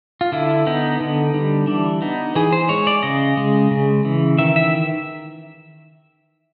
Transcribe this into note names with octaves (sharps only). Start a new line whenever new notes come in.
F4
D3 E4
B3 D#4
D3
G3
E3 D4
B3 D#4
E3 G#4
C5
G#3 C#5
D5
C#3 D#5
G#3
C#3
E3
D#3 E5
E5